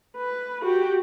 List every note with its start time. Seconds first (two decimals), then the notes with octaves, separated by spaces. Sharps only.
0.17 B4
0.61 F#4 G4